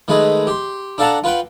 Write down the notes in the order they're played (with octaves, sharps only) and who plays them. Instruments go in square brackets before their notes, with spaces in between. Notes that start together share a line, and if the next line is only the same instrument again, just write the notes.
[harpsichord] D#3 G#3 A3 G#4 B4
G4 C6
D4 A4 F5 F#5 A5 A#5
F4 B4 F#5 G5